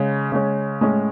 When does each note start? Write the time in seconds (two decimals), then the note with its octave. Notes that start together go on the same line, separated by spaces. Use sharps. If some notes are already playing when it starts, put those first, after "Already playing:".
Already playing: C#3 G#3 C#4
0.32 C#3 G#3 C#4
0.81 A2 G#3 C#4